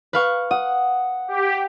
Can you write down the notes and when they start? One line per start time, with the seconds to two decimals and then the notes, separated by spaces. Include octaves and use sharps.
0.13 B4 F5 C#6
0.51 F#5 D#6
1.28 G4